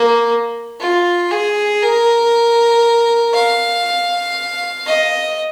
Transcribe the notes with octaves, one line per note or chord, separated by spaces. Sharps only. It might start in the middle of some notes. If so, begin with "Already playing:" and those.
Already playing: A#3
F4
G#4
A#4
F5
D#5